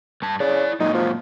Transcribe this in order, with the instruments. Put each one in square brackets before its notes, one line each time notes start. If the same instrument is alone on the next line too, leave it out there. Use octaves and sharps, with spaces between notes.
[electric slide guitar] G2 A5
[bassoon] C#3 [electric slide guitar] E4 D5
[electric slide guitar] F#2 A#2 F#3 [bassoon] D#4
[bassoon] F3